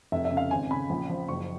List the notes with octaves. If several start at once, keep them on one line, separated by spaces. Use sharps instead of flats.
F1 E5
E5
C#3
F5
G#1 G#5
C#3 B5
A#1
F3
F#1 C#6